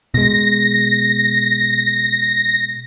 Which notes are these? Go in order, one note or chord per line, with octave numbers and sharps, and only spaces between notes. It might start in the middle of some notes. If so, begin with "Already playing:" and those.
B2 G#3 A#6